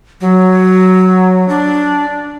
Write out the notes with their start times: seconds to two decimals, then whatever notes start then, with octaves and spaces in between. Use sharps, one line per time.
0.21 F#3
1.49 D4